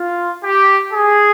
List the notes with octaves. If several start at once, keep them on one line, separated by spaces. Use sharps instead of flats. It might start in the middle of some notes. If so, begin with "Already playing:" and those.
Already playing: F4
G4
G#4